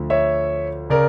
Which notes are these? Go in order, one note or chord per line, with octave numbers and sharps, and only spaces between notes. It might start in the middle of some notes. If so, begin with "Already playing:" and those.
Already playing: D2 D3 F3
C#5 E5
C#3 A#4 D5